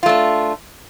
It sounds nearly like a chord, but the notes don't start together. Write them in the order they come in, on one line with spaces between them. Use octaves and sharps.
F4 A3 D4